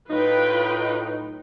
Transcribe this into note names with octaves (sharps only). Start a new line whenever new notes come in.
A2 F#3 D#4 F4 B4 G5